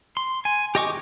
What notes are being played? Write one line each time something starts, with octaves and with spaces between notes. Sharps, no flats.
C6
G#5
G4 D#5 C#6 D6